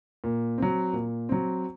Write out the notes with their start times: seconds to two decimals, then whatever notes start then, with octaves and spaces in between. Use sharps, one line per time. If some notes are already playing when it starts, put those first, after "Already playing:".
0.24 A#2
0.58 F#3 C4
0.93 A#2
1.29 F#3 C4